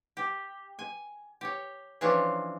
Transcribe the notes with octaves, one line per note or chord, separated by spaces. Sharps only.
G4
G#5
G4 C#5
E3 F3 C#4 D4 F4 C#5